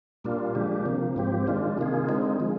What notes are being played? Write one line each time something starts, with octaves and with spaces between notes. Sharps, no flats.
A#2 G3 A#3 D4 F4
D3 F3 G#3 D4 G4
C3 F3 A#3
G#2 F3 C4 G4
D#3 G#3 D4 F4
C3 D#3 A#3 F4 G#4
D3 G#3 C4 D#4
F3 G#3